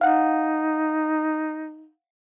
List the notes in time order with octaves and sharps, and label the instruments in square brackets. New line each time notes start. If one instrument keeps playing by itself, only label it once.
[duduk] D#4 [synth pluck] F5 F#5